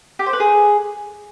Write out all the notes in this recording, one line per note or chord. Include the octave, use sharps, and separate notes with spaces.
G4
C5
B4
G#4